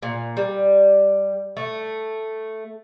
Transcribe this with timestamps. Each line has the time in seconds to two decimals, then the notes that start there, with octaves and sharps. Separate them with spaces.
0.02 A#2
0.37 G3
1.57 A3